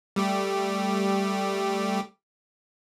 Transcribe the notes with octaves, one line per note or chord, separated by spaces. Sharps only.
G3 A3 G4